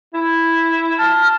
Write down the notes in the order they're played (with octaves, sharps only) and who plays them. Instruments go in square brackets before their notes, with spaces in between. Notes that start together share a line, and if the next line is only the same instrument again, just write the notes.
[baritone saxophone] E4
[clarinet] A5 [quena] F6